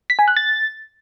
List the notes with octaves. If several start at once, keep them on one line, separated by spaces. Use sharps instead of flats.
B6
G#5
F#6
A6